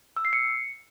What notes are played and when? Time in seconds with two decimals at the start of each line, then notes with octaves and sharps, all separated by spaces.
0.16 E6
0.25 C7
0.33 C#7